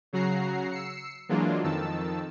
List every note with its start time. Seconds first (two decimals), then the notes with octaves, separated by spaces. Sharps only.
0.13 C#3 F#3 F#4 A#5 C7
0.71 E6 C7 C#7
1.29 E3 F#3 G#3 A#3 D4 F4
1.63 F2 D#3 A5 E6